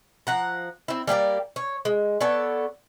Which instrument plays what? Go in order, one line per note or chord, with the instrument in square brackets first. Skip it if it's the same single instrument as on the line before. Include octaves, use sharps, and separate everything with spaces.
[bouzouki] F3 F#5 A#5
C4 E4
G3 A#3 G4 D5
C#5
G#3
B3 A4 C#5 D5